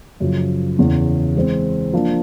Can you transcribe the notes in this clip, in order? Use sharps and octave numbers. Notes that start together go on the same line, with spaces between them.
F#2 C#3 F3
E2 C#3 E3
E3 G#3 C4 E4
F3 A#3 D4